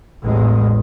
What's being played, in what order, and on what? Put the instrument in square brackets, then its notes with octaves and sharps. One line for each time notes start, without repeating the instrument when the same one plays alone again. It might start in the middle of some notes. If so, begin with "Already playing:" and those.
[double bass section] A1 E2 G#3